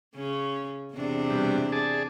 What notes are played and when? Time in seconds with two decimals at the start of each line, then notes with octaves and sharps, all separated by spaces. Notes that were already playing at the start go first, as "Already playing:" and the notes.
0.15 C#3 C#4
0.93 E2 C3 D4
1.30 B2 G3
1.72 G#4 D5 A5